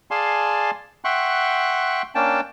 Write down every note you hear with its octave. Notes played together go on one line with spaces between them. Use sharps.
G#4 D5 F5 G#5 A5 C6
E5 F#5 G5 C6 C#6 F#6
A#3 C#4 D4 G5 A5